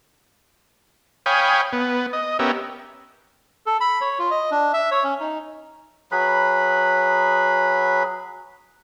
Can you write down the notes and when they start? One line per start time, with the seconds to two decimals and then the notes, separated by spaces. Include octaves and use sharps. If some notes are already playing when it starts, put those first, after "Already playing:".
1.26 C#5 F5 G5 G#5 B5 D#6
1.73 B3
2.13 D#5
2.39 B3 C#4 G4 A#4 E5
3.66 A4
3.80 B5
4.01 C#5
4.19 F4
4.31 D#5
4.51 D4
4.73 E5
4.91 C#5
5.04 C#4
5.20 D#4
6.12 F#3 G#4 B4 B5